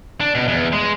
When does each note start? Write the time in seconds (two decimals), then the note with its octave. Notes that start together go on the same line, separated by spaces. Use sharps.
0.20 D4
0.35 B2
0.48 E2
0.73 G#3